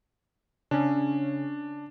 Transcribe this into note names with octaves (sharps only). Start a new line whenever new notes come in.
C#3 C#4 D4